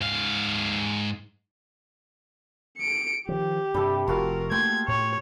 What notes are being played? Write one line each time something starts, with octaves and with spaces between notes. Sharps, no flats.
G#2 F5
C#7 D7
D#3 F3 G4
G2 C3 G3 A4
F1 F4 F#4 A#4 F5
A3 A#3 G5 C6 G#6
A2 C#5